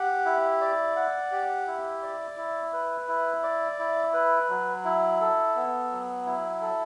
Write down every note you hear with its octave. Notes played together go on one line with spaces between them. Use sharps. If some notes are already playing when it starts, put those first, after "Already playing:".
Already playing: G4 F#5
E4
D5
F#5
G4
E4
D5
E4
B4
E4
D5
E4
B4
F#3
E4
A4
B3
F#3
E4
A4